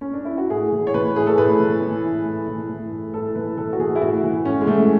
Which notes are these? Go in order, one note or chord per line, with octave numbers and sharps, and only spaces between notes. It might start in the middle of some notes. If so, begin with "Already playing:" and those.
C#4
D4
E4
F#4
A2 G#4
E3
C#5
E3 B4
A2 G#4
A4
A2 B4
E3
E3
A2
A2
E3
E3
A2
A2 A4
E3 B4
E3 A4
F#4
E3 G#4
E4
A2 F#4
E3
A2 C#4
G#3
E3 A3